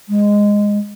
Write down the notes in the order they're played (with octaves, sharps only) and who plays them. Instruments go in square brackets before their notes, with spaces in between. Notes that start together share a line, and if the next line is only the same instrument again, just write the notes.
[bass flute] G#3